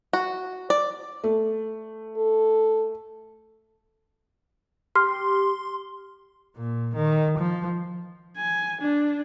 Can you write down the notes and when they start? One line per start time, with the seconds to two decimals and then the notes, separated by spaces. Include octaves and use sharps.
0.13 F#4
0.70 D5
1.24 A3
2.17 A4
4.96 G4 C6 F6
6.56 A#2
6.96 D#3
7.38 F3
8.37 G#5
8.81 D4